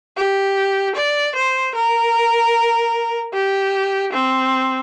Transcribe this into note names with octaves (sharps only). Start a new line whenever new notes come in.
G4
D5
C5
A#4
G4
C4